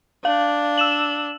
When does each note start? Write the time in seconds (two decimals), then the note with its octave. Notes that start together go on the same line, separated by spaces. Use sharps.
0.25 D4 F5
0.78 E6 E7 F#7